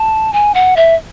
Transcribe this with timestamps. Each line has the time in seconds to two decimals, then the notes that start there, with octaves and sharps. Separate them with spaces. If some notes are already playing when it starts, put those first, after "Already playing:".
Already playing: A5
0.33 G#5
0.54 F#5
0.77 E5